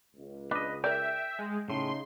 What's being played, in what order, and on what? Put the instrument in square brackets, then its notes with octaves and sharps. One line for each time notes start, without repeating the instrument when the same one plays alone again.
[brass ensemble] C#2
[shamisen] D4 [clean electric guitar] B4 D#5
[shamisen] A#4 D5 [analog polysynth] E5 [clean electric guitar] G5
[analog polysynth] G#3
[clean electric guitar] A2 [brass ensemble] C#3 D#4 [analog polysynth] C6